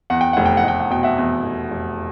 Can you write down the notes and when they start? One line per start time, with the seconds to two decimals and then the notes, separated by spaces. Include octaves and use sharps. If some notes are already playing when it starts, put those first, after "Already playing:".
0.10 E2 F#5
0.21 G5
0.33 F1 F#5
0.45 G5
0.57 F#5
0.64 F1 G5
0.80 F#5
0.90 B2 G5
1.03 E5 F#5
1.18 E2
1.44 F1
1.71 F1